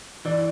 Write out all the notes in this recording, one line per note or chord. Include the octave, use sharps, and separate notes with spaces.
E3 D5